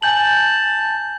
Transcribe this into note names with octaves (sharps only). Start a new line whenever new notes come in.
G#5 A5 G6 F#7